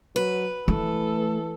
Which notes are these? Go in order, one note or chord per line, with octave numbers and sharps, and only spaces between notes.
F#3 B4
E3 A3 A4